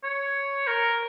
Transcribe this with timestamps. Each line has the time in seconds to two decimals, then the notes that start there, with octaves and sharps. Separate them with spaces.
0.04 C#5
0.67 A#4